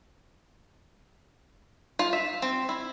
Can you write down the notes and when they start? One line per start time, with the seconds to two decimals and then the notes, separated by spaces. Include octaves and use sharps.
1.99 F4
2.13 E5
2.42 C4
2.69 E4